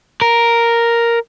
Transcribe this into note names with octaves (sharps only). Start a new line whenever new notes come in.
A#4